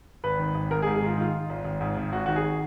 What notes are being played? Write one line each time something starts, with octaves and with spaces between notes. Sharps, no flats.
G#1 B4
D#3
G#1
G#2 A#4
G#4
G#2
G#4
D#3 F4
D#3 F4
D#3
G#1
G#1
G#2
G#1
G#1 F#4
D#3 F#4
G#4